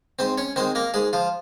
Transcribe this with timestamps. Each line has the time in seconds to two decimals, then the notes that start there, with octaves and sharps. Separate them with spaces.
0.19 G#2 C4 C5
0.38 C#4 C#5
0.56 D#3 G#3 C4 C5
0.75 A#3 A#4
0.94 G#2 G#3 G#4
1.13 F3 F4